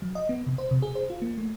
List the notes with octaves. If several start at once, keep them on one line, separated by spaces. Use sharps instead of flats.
F#3
D#5
B3
C3
C5
C3
G#4
C5
F4
A#3
A3